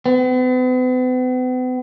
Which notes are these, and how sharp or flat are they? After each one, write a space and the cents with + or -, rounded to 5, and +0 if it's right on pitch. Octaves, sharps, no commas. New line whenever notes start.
B3 +45